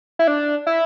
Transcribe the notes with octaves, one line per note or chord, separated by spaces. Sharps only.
E4
D4
E4